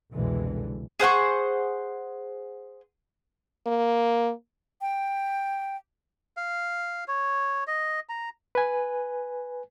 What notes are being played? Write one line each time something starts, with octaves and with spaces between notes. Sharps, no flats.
C2 F2 B2 D3 E3 G#3
G#4 C5 F#5 C#6
A#3
G5
F5
C#5
D#5
A#5
B4 G#5